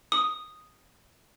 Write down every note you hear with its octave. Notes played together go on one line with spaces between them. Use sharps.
D#6